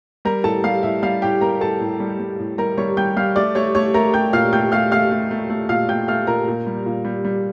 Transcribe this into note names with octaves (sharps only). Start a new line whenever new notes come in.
G3 A#4 A#5
A2 A4 A5
G3 F5
A2 E5
G3 F5
A2 G4 G5
G3 A#4 A#5
A2 A4 A5
A2
G3
G3
A2
G3 A#4 A#5
G3 C#5 C#6
G3 G5 G6
G3 F5 F6
A3 D5 D6
A3 C#5 C#6
A3 C#5 C#6
A3 A#4 A#5
A3 G5 G6
A#2 F5 F6
A3 G5 G6
A3 F5 F6
A3 F5 F6
A3
A3
A3
A#2 F5 F6
A3 G5 G6
A3 F5 F6
A#2 A#4 A#5
A#2
G3
A#2
G3
G3